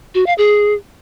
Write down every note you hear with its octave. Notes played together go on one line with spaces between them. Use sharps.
F#4
F5
G#4